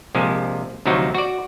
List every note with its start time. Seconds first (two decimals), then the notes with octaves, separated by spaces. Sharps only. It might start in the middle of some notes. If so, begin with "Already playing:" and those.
0.15 A#1 C3 F3 G#3
0.85 D2 C3 F3 F#3 D#4 F#4
1.15 F#4 D5